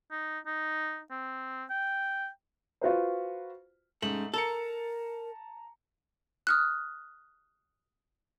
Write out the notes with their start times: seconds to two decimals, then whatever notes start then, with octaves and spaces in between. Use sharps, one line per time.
0.11 D#4
0.46 D#4
1.11 C4
1.70 G5
2.81 F4 F#4 B4 C5
4.02 G#2 A3 C#4 F#7
4.34 A4 A#4 A5 A#5 C#7
6.47 D#6 F6 F#6